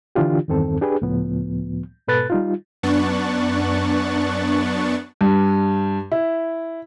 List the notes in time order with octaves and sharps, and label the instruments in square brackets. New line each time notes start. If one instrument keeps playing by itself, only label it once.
[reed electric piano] D3 E3 D4 F4 G4
E2 G2 D#3 C4 A4
D4 G4 G#4 B4
C#2 A2 F3 B3
G#2 B2 A4 B4 F#6 A6
G3 D#4 F4
[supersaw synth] F#2 B3 D4 C#6 F#6 A6
[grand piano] G2
E4